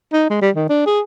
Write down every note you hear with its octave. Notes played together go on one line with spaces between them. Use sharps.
D#4
G#3
G3
D#3
D4
G#4